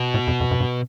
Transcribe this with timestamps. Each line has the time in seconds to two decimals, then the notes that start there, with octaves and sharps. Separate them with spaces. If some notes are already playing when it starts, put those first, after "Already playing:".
Already playing: B2
0.14 A2
0.27 F2
0.40 F2
0.51 F#2
0.60 G2